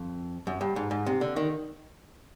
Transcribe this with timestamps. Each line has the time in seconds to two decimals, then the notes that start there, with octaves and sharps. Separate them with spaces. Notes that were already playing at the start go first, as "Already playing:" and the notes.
Already playing: F2
0.47 F#2
0.61 G2
0.76 G#2
0.91 G#2
1.06 C3
1.21 D3
1.36 D#3